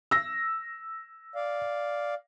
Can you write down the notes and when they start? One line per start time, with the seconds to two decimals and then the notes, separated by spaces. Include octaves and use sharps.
0.11 E6 A#6
1.35 D5 F5